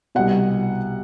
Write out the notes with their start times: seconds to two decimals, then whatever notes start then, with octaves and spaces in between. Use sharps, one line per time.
0.15 C2 B2 F#5